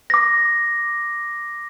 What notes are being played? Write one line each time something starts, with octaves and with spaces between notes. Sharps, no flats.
D6 A#6